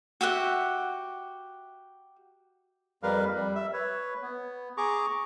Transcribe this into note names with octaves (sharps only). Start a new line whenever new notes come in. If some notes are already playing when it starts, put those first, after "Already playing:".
F#4 G4 E5 F#5
F2 G3 A#4 B4 F5
G3
E5
B4 C#5
B3
G#4 A#5 C#6 D6